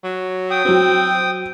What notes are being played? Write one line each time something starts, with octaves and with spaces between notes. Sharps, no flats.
F#3
G5 D#6
F#3 C4 F#4